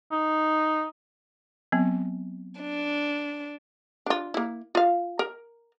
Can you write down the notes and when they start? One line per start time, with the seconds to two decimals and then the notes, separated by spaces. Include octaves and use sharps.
0.12 D#4
1.72 F#3 B3 C4
2.61 D4
4.06 D4 F4
4.34 A#3 E4
4.75 F4 F5
5.19 A#4